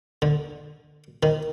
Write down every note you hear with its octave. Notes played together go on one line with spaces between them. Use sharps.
D3
D#3